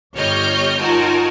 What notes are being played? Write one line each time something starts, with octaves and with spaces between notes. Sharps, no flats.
G1 G3 C#5 D#5 F6 G6
D#4 F4 F#4 A#4 G#5 A5